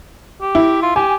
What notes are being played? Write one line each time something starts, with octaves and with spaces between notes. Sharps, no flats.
G4
E4
F4
G4 G#5